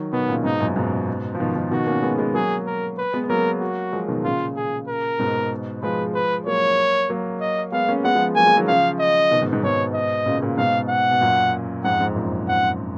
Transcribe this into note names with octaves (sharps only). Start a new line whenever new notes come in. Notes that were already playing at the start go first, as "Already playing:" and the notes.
Already playing: D#3 F#3
B2 D#3 B3
A#2 C#3
G#2 B2 D#4
F#2 A#2
G#2 B2
F3
B2 D#3
B2 D#3
B2 D#3 F#4
A#3 C#4
G#3 B3
G#3 B3
F#3 A#3 G#4
A#4
B4
G#3 B3
B3
F#3 A#3 A#4
F#4
F3 G#3
B2 D#3
A#2 C#3 F4
G#4
A#4
G#2 B2
F3 G#3 B4
B4
F#3 A#3 C#5
F#3 A#3
D#5
G#3 B3 F5
A#3 C#4
G#3 B3 F#5
F3 G#3
F#3 A#3 G#5
F3 G#3
D#3 F#3
C#3 F3 F5
D#5
B2 D#3
G#2 B2
G#2 B2
G#2 B2 C#5
D#5
A#2 C#3
A#2 C#3
G#2 B2 F5
F#5
B2
F#2 A#2
F2 G#2 F#5
F2 G#2
F#2 A#2
F#5